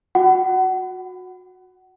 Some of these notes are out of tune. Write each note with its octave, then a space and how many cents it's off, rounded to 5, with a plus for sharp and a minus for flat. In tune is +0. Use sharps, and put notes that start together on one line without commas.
F#4 -25 F#5 +25